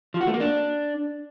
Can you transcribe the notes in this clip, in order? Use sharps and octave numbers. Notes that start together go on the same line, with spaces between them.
F3
F#4
A3
A#3
D4